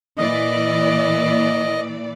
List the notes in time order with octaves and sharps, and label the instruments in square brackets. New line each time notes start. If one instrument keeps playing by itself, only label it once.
[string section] A#2 E3 D5 [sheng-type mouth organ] D#5